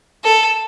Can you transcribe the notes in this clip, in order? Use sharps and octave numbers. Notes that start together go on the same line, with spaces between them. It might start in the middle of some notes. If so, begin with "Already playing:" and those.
A4